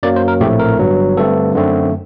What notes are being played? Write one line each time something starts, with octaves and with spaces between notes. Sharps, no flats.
F#2 F#3 A#3 D5
C5
A#4
A#1 A2 A3 C4 G4
A#4
G1 G2 F#3
G2 D3 A3 C4 A4
F#2 D3 A3 C4